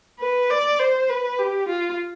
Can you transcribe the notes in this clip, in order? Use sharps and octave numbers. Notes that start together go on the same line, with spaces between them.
B4
D5
C5
B4
G4
F4